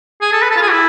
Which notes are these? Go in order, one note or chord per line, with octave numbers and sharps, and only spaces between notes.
G#4
A4
B4
A4
F4
G#4
E4